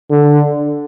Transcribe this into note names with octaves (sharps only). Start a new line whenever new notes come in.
D3